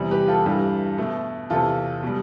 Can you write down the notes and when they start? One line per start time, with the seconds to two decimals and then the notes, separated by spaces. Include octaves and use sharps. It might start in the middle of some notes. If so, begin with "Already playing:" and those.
Already playing: E2 C3 G3
0.11 G4 B4
0.28 F4 A4
0.46 G2 E3 G3
0.98 B2 A3
1.50 E2 C3 E3 F4 A4
2.03 B2 G3